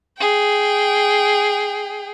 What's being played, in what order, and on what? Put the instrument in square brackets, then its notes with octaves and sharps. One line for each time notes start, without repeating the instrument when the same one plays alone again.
[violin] G#4 G5